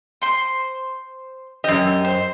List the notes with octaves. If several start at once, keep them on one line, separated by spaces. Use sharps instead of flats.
C5 C6
F#2 G4 D#5
C5